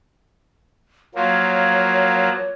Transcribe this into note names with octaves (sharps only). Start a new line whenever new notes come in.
F3 F#3 A#3 C#5